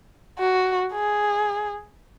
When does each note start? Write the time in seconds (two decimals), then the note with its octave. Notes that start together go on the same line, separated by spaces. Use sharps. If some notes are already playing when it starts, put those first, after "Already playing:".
0.39 F#4
0.93 G#4